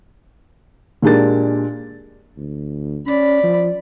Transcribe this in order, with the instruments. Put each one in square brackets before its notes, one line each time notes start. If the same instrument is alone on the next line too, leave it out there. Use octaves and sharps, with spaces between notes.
[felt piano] A#2 G#3 D4 G4 A#4 A6
[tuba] D2
[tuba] C#4 [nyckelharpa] D5 B5
[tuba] F3